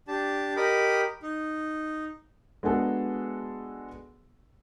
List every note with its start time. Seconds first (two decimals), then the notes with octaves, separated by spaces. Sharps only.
0.08 D4 G4 A5
0.57 G4 A#4 D#5 B5
1.23 D#4
2.63 G#3 B3 D4 F#4 G#4 A4